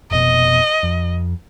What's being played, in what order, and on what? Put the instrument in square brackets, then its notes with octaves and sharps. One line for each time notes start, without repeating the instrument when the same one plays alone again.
[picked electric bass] F1 B2 [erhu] D#5
[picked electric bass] F2